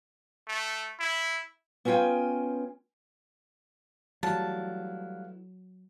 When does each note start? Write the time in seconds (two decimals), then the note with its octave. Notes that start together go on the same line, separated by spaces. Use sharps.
0.48 A3
1.00 E4
1.85 B3 C#4 E4 F4 G5 G#5
4.23 E3 F#3 G3 A3 E4 F5 F#5 A5